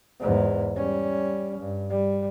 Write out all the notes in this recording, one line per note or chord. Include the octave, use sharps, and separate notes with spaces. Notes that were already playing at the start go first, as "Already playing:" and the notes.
E2 G#2
G3 C#4
G2
G3